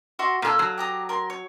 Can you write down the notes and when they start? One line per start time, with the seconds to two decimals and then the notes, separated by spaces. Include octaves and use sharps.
0.19 F#4 E5 C6
0.42 A#2 A4 F5 G#5
0.59 F#3
0.78 G4 A#5 D#6
1.09 A#4 C6
1.30 C#5